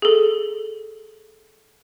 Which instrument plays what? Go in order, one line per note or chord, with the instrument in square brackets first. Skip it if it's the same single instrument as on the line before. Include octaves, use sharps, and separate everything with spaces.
[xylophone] G#4 A4